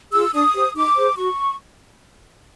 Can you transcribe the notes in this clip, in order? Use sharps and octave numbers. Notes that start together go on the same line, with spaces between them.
F4 G#4 E6
D4 D#6
G4 C5
D#4 D6
G#4 C5
F#4 C#6